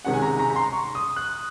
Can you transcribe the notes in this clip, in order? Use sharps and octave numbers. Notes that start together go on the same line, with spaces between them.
C3 D#3 G#3 C#4 F#5
G#5
A#5
A#5
A#5
C6
C#6
D#6
F#6